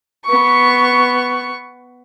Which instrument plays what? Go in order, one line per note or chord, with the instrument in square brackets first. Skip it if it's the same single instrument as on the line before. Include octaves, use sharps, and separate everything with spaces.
[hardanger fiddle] B3 C#6